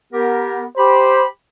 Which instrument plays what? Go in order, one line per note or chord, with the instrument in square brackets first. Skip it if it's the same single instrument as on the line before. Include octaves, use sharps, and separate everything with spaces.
[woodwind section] B3 G4 A#4
[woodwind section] G4 B5 [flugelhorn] C5